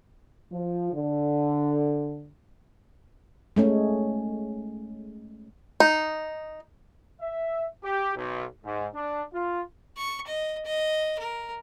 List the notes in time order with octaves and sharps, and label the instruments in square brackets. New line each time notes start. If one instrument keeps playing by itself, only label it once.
[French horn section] F3
D3
[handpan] G#3 A3 C#4
[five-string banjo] D#4
[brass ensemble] E5
G4
B1
G#2
D4
F4
[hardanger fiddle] C#6
D#5
D#5
A#4